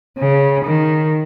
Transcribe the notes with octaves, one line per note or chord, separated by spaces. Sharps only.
C#3
D#3